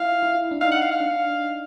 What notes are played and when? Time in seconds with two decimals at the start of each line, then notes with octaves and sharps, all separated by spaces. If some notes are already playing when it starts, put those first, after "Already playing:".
Already playing: E4 F5
0.23 E4
0.51 D4
0.61 D#4 F5
0.72 F#5
0.81 F5
0.91 F5
1.00 D4